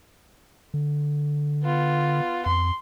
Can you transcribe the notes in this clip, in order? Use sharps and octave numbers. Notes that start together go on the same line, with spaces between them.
D3
B3 F4
F2 C6